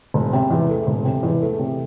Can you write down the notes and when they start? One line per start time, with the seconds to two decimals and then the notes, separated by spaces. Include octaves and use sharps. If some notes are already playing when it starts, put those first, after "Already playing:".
0.14 E1
0.33 C3
0.50 E2
0.69 A3
0.87 E1
1.05 C3
1.23 E2
1.41 A3
1.59 C3